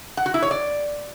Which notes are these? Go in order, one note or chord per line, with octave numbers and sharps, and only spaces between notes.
F#5
F#4
E4
C#5
D5